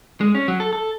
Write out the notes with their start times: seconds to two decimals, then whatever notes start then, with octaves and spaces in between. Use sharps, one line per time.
0.21 G#3
0.35 C#4
0.48 F#3
0.60 A4
0.73 A4